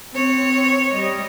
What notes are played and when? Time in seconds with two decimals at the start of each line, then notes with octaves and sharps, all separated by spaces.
0.15 C4 C#5
0.92 G3 D#5